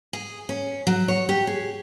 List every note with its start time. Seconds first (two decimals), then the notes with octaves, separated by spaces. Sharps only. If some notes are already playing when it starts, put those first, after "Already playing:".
0.13 G#4
0.49 C#4
0.87 F#3
1.08 C#5
1.29 G4
1.47 G#4